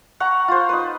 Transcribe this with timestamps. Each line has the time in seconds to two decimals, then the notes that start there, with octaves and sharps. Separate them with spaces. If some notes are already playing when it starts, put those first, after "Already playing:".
0.20 F#5 A#5 C#6
0.48 F4 C5
0.69 D#4 B4